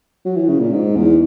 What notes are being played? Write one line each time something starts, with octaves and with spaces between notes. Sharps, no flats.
F#3
E3
C#3
A#2
G#2
E2